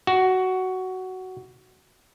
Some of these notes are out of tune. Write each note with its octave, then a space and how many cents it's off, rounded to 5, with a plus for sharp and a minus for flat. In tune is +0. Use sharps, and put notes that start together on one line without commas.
F#4 +10